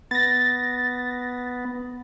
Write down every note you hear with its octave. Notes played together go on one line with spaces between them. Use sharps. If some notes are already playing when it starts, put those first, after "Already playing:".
B3 A6 A#6